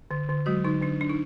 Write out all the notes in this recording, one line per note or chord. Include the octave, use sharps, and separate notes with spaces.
D3
D3
F#3 G#3 F#4
D3 D#4
D3 D4
D4
D#4